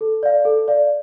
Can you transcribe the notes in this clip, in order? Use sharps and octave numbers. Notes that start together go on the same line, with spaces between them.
A4
D5 F5
A4
D5 F5